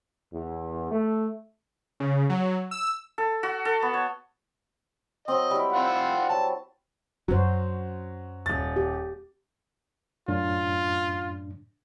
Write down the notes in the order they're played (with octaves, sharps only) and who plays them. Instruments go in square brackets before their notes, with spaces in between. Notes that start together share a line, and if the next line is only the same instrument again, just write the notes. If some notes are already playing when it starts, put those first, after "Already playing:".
[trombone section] E2
A3
[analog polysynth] C#3
F#3
E6
[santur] A4
F#4
A4
B3
C#5
[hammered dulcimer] F#3 C4 [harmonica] D#5
[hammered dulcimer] G3 E4
[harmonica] C4 F4 F#5
[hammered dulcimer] F#3 [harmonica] A5
[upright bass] F#2 C#4 [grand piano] F#3 [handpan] F#4 C5
[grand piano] D#1 A6
[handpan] G4
[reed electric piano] F#2 A2 D4 [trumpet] F4